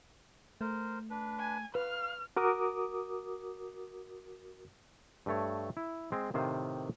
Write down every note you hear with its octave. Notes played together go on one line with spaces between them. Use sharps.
A3 A#4 C5
D4 B4
G#5
B4 F5 F6
F#4 A#4 D6 D#6
G2 A3 C#5
E4
G#3 C4
A2 C3 D#3 C5 F5